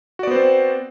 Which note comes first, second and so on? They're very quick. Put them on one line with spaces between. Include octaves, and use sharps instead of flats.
F#4 D5 B3 C5 C4